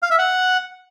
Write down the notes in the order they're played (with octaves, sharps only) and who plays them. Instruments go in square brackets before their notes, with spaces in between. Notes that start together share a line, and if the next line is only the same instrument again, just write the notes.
[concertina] F5
E5
F#5